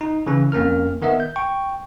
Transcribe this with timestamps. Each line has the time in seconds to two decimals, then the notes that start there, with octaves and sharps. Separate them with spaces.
0.01 D#4
0.26 C#3 E3 C#4
0.52 F2 A#3 C#4 A#4 F6
1.02 D#3 B3 A#4 D#5 E5
1.20 G6
1.36 G5 C#6